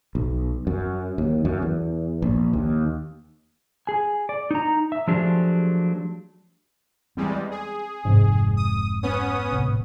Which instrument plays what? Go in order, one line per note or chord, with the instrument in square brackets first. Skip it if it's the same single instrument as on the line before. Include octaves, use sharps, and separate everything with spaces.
[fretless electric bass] B1
F#2
D#2
F#2
E2
A#1
D#2
[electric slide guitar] G#4 G#5
D5
D#4 A#5
E5
F3 F#3 A3 D4 G4 G#4
[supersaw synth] E2 G3 G#3 [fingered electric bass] C4
[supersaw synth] G#4
[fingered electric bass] F1 F2 C3 [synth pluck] G#2
[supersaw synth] D#6
B3 C#4 D#6
[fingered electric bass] D#1 A2 C3